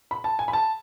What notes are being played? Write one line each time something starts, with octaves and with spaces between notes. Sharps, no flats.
B5
A5
G#5
B5
A5